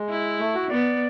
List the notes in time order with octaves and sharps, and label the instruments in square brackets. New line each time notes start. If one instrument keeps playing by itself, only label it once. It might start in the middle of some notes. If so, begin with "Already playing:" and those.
Already playing: [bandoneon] G#3
[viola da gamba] E4
[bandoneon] A3
F#4
[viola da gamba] B3 [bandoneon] D5